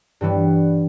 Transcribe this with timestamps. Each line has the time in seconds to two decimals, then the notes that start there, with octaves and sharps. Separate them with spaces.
0.21 G2 E3 G3 B3